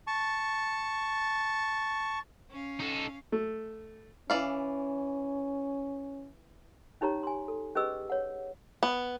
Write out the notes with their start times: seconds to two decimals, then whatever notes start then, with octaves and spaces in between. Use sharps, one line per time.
0.07 A5 C#6
2.49 C#4 F5
2.80 D#4 A4
3.32 A3
4.30 E3 C#4 D5 F5
7.01 C#4 D#4 G4 C#5 A#5
7.23 G#5 C6
7.48 A4
7.75 C#4 G4 G#4 B4 D#5 E6
8.10 C#5 F#5
8.83 B3